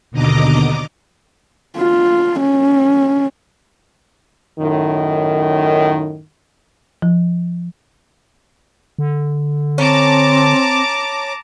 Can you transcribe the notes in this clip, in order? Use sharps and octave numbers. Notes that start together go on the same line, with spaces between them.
D#2 B2 D3 D#5 A#5 D6
F4
C#4
F#2 A2 D#3
F3
D3
C4 C#4 A5 A#5 D6